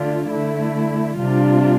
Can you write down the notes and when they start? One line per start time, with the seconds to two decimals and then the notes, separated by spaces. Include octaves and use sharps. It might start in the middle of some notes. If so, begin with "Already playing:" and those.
Already playing: D3 A3 D4 F4
0.29 D3 A3 E4
1.17 C3 G3 D4 F4